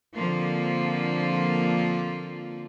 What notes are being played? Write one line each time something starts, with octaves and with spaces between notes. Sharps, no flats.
D3 F3 A#3 C4 F4